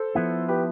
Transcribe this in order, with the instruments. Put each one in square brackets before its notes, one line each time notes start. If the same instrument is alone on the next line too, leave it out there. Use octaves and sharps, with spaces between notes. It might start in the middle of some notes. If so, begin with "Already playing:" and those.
Already playing: [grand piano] A4 C5
[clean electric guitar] F3 B3 E4
[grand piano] G4 B4